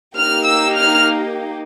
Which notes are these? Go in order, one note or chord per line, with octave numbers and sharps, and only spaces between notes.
A#3 D#4 G4 F6
E6
F6